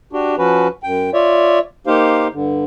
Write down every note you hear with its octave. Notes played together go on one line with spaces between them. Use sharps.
D4 F#4 G4
F3 C#4 F#4 B4
F#2 G5
F4 C#5 D5 E5
A#3 D#4 G4 C5 F5
G2 D3